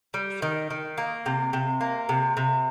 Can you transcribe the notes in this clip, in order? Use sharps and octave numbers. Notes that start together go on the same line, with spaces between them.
G3
D#3
D#3
A#3
C3
C3
A#3
C3
C3